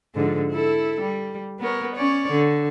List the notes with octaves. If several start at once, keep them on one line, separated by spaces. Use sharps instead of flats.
G#2 D3 F3
E4 A4
G3
B3 A#4 C#5
C#4 C#5 D5
D3